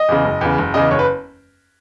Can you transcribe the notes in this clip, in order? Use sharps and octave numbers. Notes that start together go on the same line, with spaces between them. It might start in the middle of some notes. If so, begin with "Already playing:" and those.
Already playing: D#5
E2 C#3
F#1
E2 C#3
F#1
E2 C#3 D#5
F#1 C#5
B4